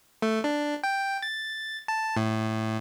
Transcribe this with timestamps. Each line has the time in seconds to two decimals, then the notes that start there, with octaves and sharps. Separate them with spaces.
0.22 A3
0.44 D4
0.84 G5
1.23 A6
1.88 A5
2.17 A2